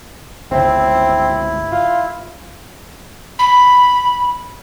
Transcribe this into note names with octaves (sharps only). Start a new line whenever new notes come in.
G1 C#2 C4 E4
F4
B5